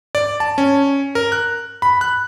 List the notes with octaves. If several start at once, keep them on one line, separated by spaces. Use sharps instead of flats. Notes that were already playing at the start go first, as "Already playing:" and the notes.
D5
A5
C#4
A#4
F#6
B5
F#6